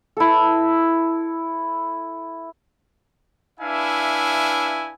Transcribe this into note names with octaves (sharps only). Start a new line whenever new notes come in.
E4 A4
D4 E4 B4 E5 F5 G#5